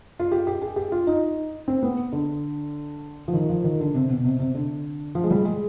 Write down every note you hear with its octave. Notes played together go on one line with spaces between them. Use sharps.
F4
G4
G4
G#4
G4
F4
D#4
C4
B3
D3
F3
D#3
F3
D#3
D3
C3
B2
C3
C3
D3
F3
G#3
G3
G#3